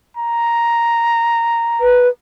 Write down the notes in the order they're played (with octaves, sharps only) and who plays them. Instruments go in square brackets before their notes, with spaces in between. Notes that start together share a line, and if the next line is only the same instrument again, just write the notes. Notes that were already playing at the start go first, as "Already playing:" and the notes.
[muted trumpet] A#5
[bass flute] B4